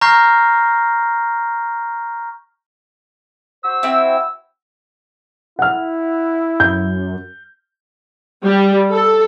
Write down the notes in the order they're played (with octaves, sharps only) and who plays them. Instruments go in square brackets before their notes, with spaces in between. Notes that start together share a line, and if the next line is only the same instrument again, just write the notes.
[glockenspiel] A#5 C#6 F6 G6 A#6 C7
[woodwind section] F#4 C5 E6
[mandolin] C4 E4
[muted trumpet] E4 [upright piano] F#5 F6
[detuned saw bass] F#2 [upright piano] G6
[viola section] G3
A4